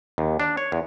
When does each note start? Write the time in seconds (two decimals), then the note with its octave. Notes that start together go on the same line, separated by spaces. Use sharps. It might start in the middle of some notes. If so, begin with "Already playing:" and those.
0.18 D#2
0.40 D4
0.57 C#5
0.72 E2